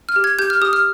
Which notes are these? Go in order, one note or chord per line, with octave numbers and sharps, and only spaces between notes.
F6
G4
G#6
G4 G6
F6
G4 D#6
F6